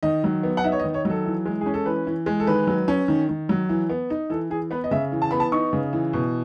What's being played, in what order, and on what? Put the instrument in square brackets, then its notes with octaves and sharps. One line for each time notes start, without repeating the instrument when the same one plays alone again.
[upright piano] D#3 D#5
F#3
B3
F#5
D#4 E5
C#5
D#5
D#3
C#5
F#3 A4
E3
G#3
C#4 G#4
A4
E3 B4
E3
G#3
A4
D#3 B4
F#3
C#4
D#3
D#3
F#3
E3
B3
D#4
E3 A4
E3 G#4
B3 B4
D#5
C#3 E5
E3
A5
B3 B5
A5
D#4 C#6
C#3
E3
B2